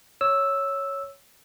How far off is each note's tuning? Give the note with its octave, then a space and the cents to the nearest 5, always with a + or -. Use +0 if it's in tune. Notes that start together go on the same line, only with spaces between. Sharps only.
C#5 +0 E6 +0